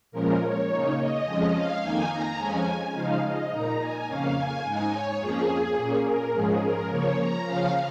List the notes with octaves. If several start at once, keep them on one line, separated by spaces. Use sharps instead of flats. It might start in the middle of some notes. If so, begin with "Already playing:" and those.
A#2 F3 G#3 C#4 A#4
C#5
C#3 A#3 D#4
D#5
F2 F3 G#3 C#4
F5
F2 D#3 A#3 D#4 G#5
A#5
F2 F3 G#3 C#4 G#5
C#3 F3 G#3 D#4 F5
D#5
A#2 A#3 D#4 A#5
G#5
F2 C#3 A#3 C#4 F5
G#5
G#2 G#3 D#4 G#5
C#5
F2 F3 A#3 C#4 G#4
A#2 A#3 C#4
A#4
G#2 F3 G#3 C#4 G#4
A#4
C#3 F3 A#3 C#5
A#5
C#3 F3 C#4 F5